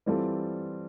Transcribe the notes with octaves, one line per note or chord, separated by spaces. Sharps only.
E3 G3 C4 F4 A4